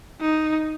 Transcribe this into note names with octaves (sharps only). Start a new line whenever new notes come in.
D#4